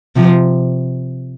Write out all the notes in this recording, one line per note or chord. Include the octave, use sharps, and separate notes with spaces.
C3 F3